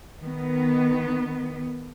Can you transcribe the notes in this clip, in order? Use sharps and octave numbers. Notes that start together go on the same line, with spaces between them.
D#3 B3